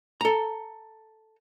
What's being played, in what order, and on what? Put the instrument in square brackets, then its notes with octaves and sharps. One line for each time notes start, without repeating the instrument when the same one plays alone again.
[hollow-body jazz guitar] A4 A#5